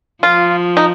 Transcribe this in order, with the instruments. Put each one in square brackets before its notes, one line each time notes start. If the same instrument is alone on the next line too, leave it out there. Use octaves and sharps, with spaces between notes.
[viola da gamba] F3 [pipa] F4
[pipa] D#4